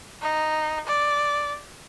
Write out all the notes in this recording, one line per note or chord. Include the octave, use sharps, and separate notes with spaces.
D#4
D5